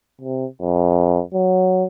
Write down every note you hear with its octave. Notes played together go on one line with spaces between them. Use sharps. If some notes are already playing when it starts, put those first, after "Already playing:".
C3
F2
F#3